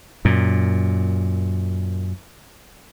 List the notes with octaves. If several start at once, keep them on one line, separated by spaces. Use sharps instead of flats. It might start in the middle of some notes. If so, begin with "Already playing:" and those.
F#2 A#2